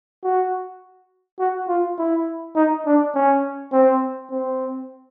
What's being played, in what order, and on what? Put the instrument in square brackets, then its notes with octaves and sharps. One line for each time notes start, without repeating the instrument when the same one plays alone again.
[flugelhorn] F#4
F#4
F4
E4
D#4
D4
C#4
C4
C4